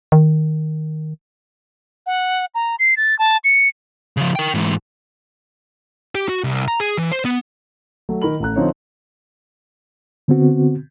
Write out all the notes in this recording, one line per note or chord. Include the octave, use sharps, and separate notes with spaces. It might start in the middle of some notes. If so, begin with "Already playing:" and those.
D#3
F#5
A#5
C7
A6
A5
C#7
C#3 F3
A#4 G5
G#2 E3
G4
F#4
C2
A#5
G#4
E3
C5
B3
F#3 A3
D#3 A#4 B5 F#7
A1 A4 A#5 F#6
D3 F3 C4 D#4 A4 C#5
D3 B3 C4 F#4